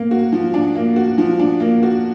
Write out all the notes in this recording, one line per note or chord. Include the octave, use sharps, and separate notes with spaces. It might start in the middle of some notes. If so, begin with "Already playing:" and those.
Already playing: A#3
F#4
F3
D4
A#3
F#4
F3
D4
A#3
F#4